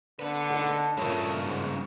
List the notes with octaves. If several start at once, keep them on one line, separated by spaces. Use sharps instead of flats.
D3 B4 F#5
D#4 A4
G2 A#2 C#3 F#3 A3
G#2